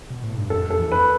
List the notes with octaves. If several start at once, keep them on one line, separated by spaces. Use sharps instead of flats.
B2
A2
G2
F2 A4
F2 A4
E2
B4